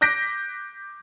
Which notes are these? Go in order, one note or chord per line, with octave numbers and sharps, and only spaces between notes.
D6 F#6 G6 A#6 B6 D7